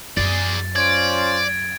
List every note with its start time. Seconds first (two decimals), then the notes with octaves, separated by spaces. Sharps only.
0.17 F#2 F#3 G#4 D5 A6
0.76 C#4 F4 C5 D5 G#6 D7